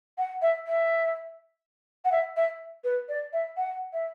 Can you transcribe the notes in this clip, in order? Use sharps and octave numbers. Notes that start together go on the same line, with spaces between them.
F#5
E5
E5
F#5
E5
E5
B4
D5
E5
F#5
E5